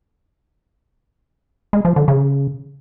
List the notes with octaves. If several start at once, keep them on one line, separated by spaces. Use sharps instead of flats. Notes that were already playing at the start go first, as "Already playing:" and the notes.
G#3
F3
D3
C#3